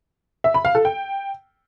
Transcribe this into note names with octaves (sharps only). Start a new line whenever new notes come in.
E5
B5
F5
A4
G5